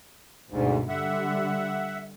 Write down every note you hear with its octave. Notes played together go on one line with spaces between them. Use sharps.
G1 D2 G#2 B2
D3 G3 E5 F#5